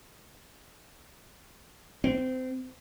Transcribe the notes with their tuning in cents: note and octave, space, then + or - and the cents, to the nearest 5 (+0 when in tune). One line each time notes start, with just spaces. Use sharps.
C4 -25